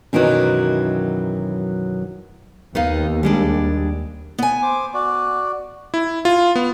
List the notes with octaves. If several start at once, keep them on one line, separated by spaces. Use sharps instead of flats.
F#2 B2 D#3 E3 F#3
D#2 B3 D#4 F5
G3 G#3 D4
B3 G#5
C5 D6
F#4 D5
E4
F4
B3